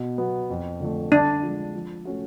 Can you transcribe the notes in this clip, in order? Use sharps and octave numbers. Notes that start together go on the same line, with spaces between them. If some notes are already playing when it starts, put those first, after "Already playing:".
Already playing: B2
F#3 B3
F2
D3 F3 A3
D3 D4
F3 G#3
F3
A3 C#4 F#4